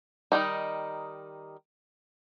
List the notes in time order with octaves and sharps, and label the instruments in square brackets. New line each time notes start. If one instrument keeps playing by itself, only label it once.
[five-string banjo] D#3 F3 G3 D#4